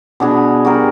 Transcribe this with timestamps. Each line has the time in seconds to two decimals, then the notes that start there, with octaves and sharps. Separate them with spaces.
0.20 B2 D4 G#4 B5
0.65 F#4 G4 A#4